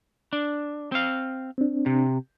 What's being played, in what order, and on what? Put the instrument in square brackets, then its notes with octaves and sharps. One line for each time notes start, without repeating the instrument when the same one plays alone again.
[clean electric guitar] D4
C4 F5
[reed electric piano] C4 D4
[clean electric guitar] C3